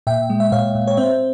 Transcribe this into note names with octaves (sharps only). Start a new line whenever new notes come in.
A#2 E5 G5
G#3
E5
A#2 C#5 F5
A#2
C#5
C4 C5 E5